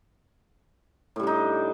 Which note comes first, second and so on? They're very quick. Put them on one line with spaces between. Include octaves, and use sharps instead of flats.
A2 G3 D4 D#4